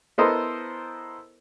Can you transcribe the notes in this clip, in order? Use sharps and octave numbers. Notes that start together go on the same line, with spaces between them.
B3 E4 A4 A#4 C5 D#5